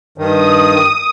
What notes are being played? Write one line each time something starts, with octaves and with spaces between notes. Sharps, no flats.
G2 D#3 D#6